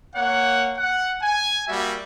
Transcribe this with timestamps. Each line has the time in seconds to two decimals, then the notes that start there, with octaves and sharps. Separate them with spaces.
0.15 A#3 C#5 F#5
0.77 F#5
1.23 G#5
1.67 G3 A#3 F#4 E5